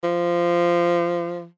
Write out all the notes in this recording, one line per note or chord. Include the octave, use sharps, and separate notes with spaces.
F3